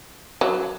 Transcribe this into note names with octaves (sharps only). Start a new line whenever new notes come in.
F#3